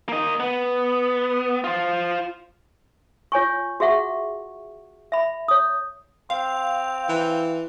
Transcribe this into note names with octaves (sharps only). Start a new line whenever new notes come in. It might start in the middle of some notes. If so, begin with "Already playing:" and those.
A#3 D#5
B3
F4 C5
F4 C#5 G#5 C#6
F#4 G#4 E5 F#5 C#6
E5 B5
C#5 D#6
C4 F5
E3